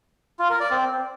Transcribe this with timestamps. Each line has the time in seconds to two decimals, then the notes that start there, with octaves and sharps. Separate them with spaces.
0.39 F4
0.50 A#4
0.60 D5
0.71 C4